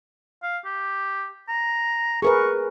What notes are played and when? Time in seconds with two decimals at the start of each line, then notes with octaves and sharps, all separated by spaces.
0.43 F5
0.65 G4
1.49 A#5
2.22 G#4 A#4 B4 C#6